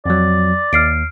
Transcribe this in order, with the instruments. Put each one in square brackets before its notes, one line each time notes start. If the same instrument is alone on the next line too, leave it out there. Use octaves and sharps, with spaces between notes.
[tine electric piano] F2 F#3 [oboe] D5
[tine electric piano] D#2 [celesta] F6 C7 D7